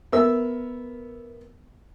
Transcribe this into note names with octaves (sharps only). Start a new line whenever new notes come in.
B3 A#4 E5 E6